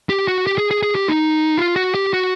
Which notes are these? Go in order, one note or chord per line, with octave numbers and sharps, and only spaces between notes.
G4
F#4
G4
G#4
G#4
G#4
G4
D#4
F4
F#4
G4
F#4